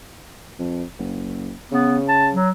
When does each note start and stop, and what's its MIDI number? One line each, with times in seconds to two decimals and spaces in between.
0.59 0.84 41
0.99 1.53 30
1.72 2.35 49
1.72 1.98 59
2.09 2.28 81
2.34 2.50 54